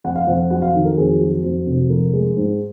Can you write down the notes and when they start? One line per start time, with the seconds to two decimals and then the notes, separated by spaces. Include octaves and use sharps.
0.04 F2 F#5
0.16 F5
0.27 F2 F#5
0.50 F#3 F#5
0.62 F5
0.74 D#3
0.85 A#4
0.97 F2 G#4
1.20 F#3
1.44 F2
1.66 F1
1.90 F3 A#4
2.13 G#3
2.37 G#2